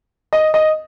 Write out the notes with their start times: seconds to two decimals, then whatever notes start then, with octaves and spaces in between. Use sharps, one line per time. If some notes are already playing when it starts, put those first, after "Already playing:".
0.33 D#5
0.54 D#5